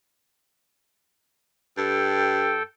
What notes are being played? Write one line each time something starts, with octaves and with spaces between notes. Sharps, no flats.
G2 A4 G5